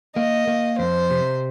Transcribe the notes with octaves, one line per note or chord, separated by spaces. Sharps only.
A#3 D#5
A#3
F2 C5
C3